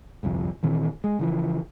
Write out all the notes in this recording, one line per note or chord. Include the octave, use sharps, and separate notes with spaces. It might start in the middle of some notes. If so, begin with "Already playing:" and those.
G1 C2 F2 F3
A#2 D#3 E3 C4
G#3
C#3 E3 F3